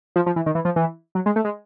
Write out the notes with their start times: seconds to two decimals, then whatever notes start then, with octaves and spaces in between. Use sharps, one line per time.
0.16 F3
0.26 F3
0.36 E3
0.46 D#3
0.55 E3
0.65 F3
0.76 E3
1.15 F#3
1.26 G#3
1.36 A3
1.45 G#3